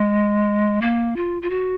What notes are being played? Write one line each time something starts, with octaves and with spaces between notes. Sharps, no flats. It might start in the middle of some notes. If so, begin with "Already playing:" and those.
Already playing: G#3
A#3
F4
F4
F#4